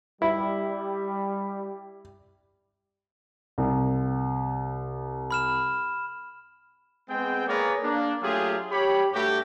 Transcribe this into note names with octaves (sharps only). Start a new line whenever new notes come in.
G3 E4
C2
B5 F6 E7
G#3 B3 C4 G#4 G5
A#3 G#4 A#4 B4 C#5 D5
A#3 D4
F#3 A3 F4 G4 G#4
G4 C#5 B5
G2 A3 F#4 G4